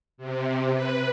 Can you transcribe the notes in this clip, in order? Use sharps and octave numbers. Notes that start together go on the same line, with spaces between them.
C3
B4